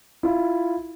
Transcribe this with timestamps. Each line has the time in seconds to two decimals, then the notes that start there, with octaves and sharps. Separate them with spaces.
0.23 E4 F4